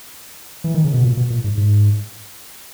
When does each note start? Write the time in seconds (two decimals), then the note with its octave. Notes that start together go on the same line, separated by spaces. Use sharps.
0.64 E3
0.74 D#3
0.84 C#3
0.94 B2
1.04 A#2
1.17 B2
1.30 A#2
1.44 G#2
1.57 G#2